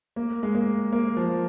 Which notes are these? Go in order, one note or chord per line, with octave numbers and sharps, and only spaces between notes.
A#3
G#3
A#3
A#3
F3